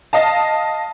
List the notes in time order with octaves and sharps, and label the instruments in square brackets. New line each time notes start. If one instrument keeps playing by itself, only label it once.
[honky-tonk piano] D#5 F5 A5